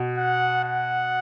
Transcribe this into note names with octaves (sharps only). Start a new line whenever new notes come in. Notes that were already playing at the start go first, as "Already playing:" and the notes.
Already playing: B2
F#5
F#5